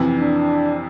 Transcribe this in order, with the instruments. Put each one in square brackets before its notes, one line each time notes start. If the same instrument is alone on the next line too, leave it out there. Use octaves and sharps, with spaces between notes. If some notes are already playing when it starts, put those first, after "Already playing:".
Already playing: [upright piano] F2 C3 E3
[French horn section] D4